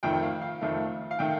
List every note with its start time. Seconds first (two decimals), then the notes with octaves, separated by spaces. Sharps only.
0.03 F2 D#3 A3 G5
0.23 F5
0.42 F5
0.61 F2 D#3 A3
1.11 F5
1.19 D#3 A3 G5